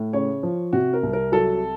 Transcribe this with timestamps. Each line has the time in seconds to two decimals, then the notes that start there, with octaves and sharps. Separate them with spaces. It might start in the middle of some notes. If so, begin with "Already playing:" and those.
Already playing: A2
0.13 C#3 C#5
0.43 F3
0.73 C3 F#4
0.93 A#4
1.03 C2
1.13 A#4
1.32 F#3 A4